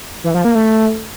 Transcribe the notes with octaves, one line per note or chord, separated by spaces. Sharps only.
E3
F3
A#3
A3